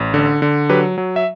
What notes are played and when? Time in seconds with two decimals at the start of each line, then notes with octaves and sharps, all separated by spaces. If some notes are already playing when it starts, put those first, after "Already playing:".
Already playing: A1
0.14 D3
0.42 D3
0.70 F#3 G4 B4
0.98 F#3
1.16 E5